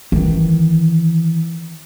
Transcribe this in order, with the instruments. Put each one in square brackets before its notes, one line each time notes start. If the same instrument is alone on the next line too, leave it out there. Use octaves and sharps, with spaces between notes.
[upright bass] D#3 E3